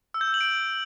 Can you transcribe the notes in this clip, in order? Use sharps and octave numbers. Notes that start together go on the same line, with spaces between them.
E6
G6
E6
F#7
D7